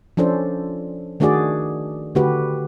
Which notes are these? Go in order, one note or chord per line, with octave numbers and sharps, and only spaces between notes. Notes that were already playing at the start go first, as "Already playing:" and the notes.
F3 C#4 D4 A4 C5
D#3 A3 D4 F#4 G#4 D5
D3 A3 F#4 G4 B4